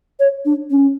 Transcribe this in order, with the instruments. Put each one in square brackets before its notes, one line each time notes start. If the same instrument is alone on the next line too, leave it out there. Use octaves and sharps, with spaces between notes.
[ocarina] C#5
D4
C#4